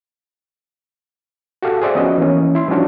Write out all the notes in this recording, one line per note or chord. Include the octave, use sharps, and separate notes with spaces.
F#4 G4 A4 F5 F#5
G#4 C5 D5 E5 F#5
F3 B3 C#4 F#4 D#5
E3 A#3 C#4
E4 C6
F3 G3 C#4 D4 F#4